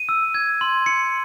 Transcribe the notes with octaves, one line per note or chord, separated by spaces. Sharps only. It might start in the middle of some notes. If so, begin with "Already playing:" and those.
Already playing: D#7
E6
G#6
C6
C#7